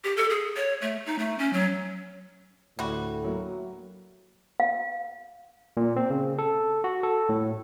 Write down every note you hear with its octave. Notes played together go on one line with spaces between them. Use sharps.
G4
A4
G#4
C#5
A3
D#4
A3
C#4
F#3
D2 A2 G3 F#4
F#3 A#3 E4
F5
A#2
C4
C#3
A4
F#4
A4
A2